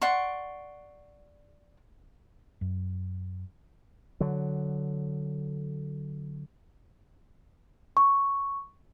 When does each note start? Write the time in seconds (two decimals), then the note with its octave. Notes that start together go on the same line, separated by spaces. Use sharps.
0.02 D5 F#5 C6 C#6
2.61 F#2
4.20 D3 F#3
7.97 C#6